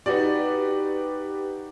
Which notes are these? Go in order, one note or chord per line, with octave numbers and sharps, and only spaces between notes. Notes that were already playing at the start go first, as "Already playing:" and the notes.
D#4 F#4 G4 B4 D5